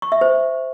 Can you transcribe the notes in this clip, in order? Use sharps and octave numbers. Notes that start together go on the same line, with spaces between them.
C#6
E5
C5